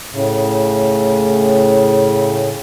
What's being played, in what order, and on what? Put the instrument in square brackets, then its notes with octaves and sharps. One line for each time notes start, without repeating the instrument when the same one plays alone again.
[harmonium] A2 C#3